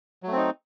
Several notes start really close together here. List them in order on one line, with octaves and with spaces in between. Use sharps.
F#3 A3 C4 D#4